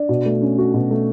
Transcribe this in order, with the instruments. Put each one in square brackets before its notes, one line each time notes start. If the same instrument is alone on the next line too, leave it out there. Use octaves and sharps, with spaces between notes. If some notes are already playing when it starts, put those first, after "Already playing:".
Already playing: [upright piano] D4
B2
A3
C#4
F#4
B2
A3